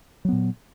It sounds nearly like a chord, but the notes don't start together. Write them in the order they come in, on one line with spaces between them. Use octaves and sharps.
F#3 B3 A#2